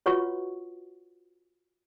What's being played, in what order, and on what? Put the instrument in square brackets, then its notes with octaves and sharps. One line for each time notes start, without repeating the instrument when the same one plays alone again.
[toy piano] F4 F#4 B4 C#5 F#5 C#6